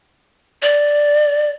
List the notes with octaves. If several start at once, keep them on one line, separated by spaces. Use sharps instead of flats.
D5